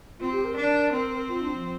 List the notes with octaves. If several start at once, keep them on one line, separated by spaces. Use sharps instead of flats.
C4 F4
G4
A#4
D4
C4
F4
D4
F3